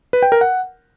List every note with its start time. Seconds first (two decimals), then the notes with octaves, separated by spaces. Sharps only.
0.13 B4
0.23 G5
0.32 A#4
0.41 F#5